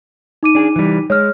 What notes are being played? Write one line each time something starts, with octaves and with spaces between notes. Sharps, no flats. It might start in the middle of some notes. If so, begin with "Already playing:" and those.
D#4 D6 D#7
D4 G#4
E3 G3
G#3 C#5 F6